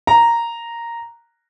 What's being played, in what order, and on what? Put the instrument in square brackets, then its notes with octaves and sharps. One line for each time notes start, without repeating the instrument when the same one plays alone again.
[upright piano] A#5